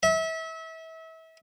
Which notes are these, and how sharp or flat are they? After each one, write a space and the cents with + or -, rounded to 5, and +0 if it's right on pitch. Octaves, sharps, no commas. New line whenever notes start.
E5 -30